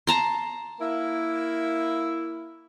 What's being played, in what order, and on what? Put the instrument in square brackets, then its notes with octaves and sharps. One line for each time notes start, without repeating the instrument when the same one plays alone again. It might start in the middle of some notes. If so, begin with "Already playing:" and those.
[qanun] A5 A#5 C6
[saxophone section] A#3 E4